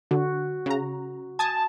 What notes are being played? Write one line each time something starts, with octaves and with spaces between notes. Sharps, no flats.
D3 F#4
C#3 A#5
G#5 A5 D#6 G#6